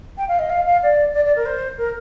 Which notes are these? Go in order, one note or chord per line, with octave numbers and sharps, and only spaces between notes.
G5
F5
D#5
F5
F5
D5
D5
D5
A#4
C5
A#4